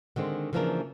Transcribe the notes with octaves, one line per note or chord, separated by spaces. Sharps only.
D3 D#3 G#3 C4
C#3 E3 F3 A#3 D4 A#4